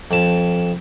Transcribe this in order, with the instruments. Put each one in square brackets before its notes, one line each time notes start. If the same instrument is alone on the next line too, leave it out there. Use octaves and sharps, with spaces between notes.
[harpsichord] F2 A5